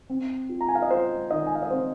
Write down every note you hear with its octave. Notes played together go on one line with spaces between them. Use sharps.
C4
F4
A#5
G#5
F5
D#5
F4 C5
D#3 D#5
G#5
F5
D#5
C4 C5